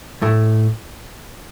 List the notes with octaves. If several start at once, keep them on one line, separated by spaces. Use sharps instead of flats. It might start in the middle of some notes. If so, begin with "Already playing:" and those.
A2 A3